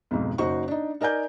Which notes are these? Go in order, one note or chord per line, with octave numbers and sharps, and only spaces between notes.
B1 F2 G#2 B2
F#1 D#4 F#4 C5 C#6
D4 D#4
D#4 A#4 D5 G#5 G6